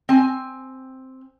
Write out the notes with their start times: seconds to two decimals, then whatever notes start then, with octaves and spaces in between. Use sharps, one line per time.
0.09 C4 G#5